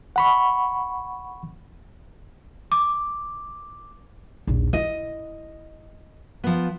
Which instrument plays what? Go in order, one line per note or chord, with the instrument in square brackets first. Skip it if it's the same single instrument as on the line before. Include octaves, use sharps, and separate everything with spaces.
[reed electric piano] F#5 B5 C#6
[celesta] D6
[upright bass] A#1 D#2
[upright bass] E4 [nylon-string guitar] D#5
[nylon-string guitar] F3 B3